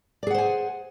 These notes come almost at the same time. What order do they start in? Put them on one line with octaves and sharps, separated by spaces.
D5 G#4 F#5 C5 G#5